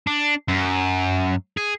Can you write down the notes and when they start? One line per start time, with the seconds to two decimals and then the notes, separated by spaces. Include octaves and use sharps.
0.07 D4
0.49 F#2
1.57 G#4